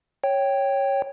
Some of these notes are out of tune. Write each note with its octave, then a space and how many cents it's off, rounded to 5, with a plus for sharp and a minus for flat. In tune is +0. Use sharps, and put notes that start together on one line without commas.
C#5 -5 G5 +0